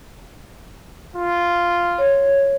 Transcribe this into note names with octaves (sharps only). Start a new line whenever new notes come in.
F4
C#5